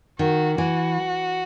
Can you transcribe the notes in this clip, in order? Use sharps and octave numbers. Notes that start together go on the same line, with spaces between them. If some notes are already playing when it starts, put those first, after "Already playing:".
D#3 F#4
E3 F#4